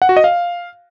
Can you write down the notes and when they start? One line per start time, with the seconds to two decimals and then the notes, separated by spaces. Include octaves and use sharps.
0.02 F#5
0.09 F#4
0.17 D#5
0.24 F5